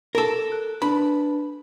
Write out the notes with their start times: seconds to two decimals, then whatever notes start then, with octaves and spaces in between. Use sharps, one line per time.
0.15 A4 A#4
0.52 F#6
0.82 D4 B4 A5 B5